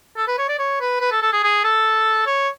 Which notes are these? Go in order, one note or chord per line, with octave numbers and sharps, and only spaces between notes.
A4
B4
C#5
D5
C#5
B4
B4
A4
A4
G#4
G#4
A4
C#5